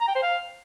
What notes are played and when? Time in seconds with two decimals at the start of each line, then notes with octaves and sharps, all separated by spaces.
0.01 A#5
0.08 G5
0.15 C5
0.23 F5